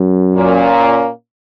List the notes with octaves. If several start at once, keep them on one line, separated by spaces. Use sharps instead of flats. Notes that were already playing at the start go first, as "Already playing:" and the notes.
Already playing: F#2
A#2 A#3 C#4